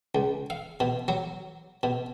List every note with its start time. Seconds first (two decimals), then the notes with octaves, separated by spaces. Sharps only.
0.15 C#2
0.50 F5
0.80 B2
1.08 F#3
1.83 B2